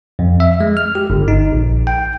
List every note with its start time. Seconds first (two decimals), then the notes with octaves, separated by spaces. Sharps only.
0.19 F2
0.40 E5
0.60 G#3
0.77 F6
0.95 G4
1.10 G1
1.28 D#4
1.53 A#1
1.87 G5